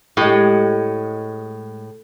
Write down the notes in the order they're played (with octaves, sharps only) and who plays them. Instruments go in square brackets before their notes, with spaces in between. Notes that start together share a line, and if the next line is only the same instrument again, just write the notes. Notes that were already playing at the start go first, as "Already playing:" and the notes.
[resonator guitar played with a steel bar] A2 [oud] G#3 G4